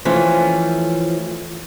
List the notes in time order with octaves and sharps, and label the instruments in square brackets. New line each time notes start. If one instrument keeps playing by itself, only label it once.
[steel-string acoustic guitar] E3 F3 A3 C#4